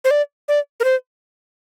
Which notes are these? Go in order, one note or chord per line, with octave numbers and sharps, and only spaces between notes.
C5
D5
D5
A#4
C5